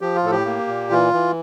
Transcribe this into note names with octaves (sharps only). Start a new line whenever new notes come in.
F3 G4
F4
A2 A4
G4
A#3
A#2
E3 F4
E3